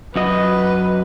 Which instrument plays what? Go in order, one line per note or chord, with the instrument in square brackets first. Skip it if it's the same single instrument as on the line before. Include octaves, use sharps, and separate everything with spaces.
[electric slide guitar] F#2 F#4 D#5 [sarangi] B4